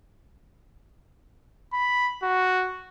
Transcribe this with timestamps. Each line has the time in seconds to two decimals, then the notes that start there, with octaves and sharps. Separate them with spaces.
1.73 B5
2.23 F#4